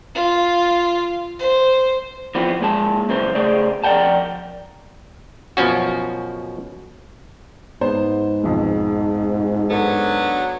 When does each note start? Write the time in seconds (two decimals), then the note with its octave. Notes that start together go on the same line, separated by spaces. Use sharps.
0.15 F4
1.40 C5
2.35 E3 F3 B3 C4
2.60 A#2 G#3 A5
3.09 C2 F#2 C#3 E3 C5
3.35 C#3 A3 G#4 C5 D5
3.84 F2 A#4 D5 F#5 G5 A5
5.57 F#2 B2 F3 C#4 F#4
7.81 G#2 B3 C5
8.44 B1 F2 B2
9.70 F#3 B3 D4 A4